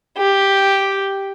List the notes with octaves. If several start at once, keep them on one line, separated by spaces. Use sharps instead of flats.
G4